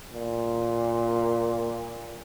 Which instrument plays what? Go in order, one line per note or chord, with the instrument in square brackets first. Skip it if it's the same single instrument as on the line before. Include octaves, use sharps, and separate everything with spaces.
[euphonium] A#2